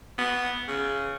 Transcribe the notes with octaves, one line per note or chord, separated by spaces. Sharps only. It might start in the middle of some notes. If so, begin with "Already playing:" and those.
B3
C#3